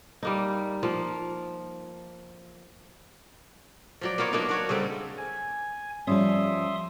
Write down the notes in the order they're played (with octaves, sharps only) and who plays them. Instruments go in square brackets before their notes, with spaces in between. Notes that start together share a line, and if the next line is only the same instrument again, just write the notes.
[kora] G3 A#3 D#4
F3 A#3
F3 F#3 D5
A#3 B3 F4 C#5
F#3 A#3 D4 D#4
D4 F#4 C#5
C#3 G3 C4 A4
[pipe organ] G#5
[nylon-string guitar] F3 G3 C#4 [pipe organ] E5 C6 D#6